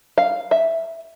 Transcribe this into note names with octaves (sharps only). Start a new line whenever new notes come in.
F5
E5